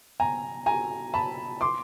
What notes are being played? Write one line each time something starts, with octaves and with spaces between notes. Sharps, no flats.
G#5 A#5
G#5 A#5
A5 B5
C6 D6